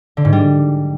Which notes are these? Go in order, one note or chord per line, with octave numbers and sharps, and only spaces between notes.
D3
G#2
G3